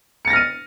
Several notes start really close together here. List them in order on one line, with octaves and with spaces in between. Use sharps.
C#7 A6 A#6 F6 D#7